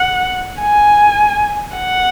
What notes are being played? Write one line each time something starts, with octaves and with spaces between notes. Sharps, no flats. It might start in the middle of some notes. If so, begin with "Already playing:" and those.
Already playing: F#5
G#5
F#5